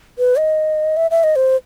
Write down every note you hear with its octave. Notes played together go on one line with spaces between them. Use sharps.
B4
D#5
E5
E5
D#5
C5